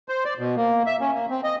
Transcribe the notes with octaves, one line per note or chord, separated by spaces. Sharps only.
C5
D5
B2
A#3
E5
C#4
A#3
C4
D#5